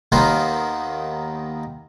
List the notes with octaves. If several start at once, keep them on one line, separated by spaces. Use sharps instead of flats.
D#2 D#3 A#3 B3 C5